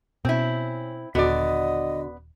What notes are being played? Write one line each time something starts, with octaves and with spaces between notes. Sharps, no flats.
B2 C4 C#4 E4
D#1 D3 B3 F#4 D5 D#5